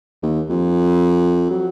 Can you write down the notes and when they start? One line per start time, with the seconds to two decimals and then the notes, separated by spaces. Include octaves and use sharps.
0.22 D#2
0.50 F2
1.51 F#3